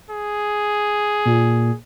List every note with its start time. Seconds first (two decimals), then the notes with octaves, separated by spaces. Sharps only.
0.11 G#4
1.25 A#2